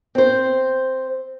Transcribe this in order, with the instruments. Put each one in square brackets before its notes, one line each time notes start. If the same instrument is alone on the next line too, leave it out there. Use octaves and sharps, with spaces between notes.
[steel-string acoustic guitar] C4 C5